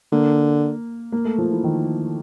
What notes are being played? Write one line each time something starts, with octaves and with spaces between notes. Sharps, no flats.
D3 A#3
A#3
A3
F3
E3
D#3